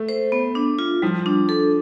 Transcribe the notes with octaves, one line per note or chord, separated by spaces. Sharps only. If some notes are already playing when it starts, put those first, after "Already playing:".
Already playing: A3
C5
B3
D4
F4
F3 G3
D4
A4